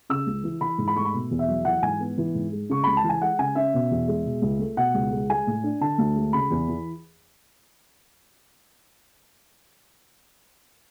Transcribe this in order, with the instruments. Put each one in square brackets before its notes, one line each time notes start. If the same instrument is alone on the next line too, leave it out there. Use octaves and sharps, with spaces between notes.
[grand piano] C#3 E6
C#2
E3
E3 B5
G#2
B5
A3 C#6
B5
B2
E2
E5
F#3
E3 F#5
G#2 G#5
B3
E3
G#2
G#3
C#3 C#6
C#2 B5
A5
E3
G#5
G#3 F#5
C#3 G#5
C#4 E5
B2
E2
G#3
B2
C#2
A3
B2 F#5
C#2
G#3
G#3 G#5
A2
D4
D3 A5
D2
G#3
C#3 B5
E2
E3